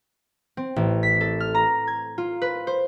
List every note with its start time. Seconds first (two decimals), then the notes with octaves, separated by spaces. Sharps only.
0.57 C4
0.76 A1
1.03 B6
1.21 A4
1.40 F6
1.55 A#5
1.87 G#6
2.18 F4
2.42 B4
2.67 C5